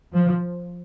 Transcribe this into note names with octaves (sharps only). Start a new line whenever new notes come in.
F3